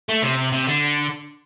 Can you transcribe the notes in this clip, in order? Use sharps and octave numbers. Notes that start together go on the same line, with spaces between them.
A3
C3
C3
D3